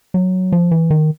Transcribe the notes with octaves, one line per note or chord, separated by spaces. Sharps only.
F#3
F3
E3
D#3